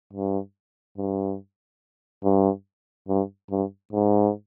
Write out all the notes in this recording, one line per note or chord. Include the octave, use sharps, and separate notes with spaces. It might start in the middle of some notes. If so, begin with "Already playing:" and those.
G2
G2
G2
G2
G2
G#2